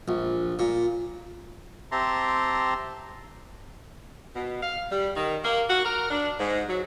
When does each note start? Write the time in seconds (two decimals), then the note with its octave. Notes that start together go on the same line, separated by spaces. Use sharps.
0.08 A#1
0.59 A#2
1.92 C4 G4 E5 A5 A#5 C6
4.35 B2
4.62 F5
4.91 G3
5.17 D#3
5.44 A#3
5.69 F#4
5.85 A#4
6.11 D4
6.40 G#2
6.68 F#3